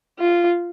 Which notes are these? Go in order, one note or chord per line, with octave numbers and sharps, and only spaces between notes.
F4